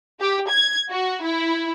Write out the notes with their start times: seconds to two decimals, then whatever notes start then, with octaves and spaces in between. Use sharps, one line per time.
0.20 G4
0.50 G#6
0.91 F#4
1.24 E4